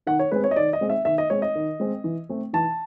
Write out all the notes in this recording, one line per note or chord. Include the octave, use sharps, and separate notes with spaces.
D#3 F#5
C#5
G#3 C4 B4
C#5
D#5
D#3 D5
D#5
G#3 C4
E5
D#3 E5
D#5
G#3 C4 C#5
D#5
D#3
G#3 C4
E3
A3 C4
E3 A5